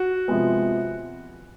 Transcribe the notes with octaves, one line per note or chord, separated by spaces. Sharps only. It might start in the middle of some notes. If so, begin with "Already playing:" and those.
Already playing: F#4
C3 F3 G#3 B3